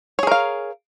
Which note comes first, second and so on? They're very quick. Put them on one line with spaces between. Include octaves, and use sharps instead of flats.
C#5 G#4 A#4 F5